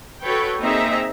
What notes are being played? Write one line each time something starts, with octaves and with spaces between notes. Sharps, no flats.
F#4 A4 B4 C#5 G5
A#3 C4 D#4 G#4 E5 A#5